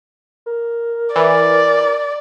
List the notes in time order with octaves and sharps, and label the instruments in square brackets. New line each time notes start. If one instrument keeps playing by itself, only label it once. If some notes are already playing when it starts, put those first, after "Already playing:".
[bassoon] A#4
[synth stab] E3 [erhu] D5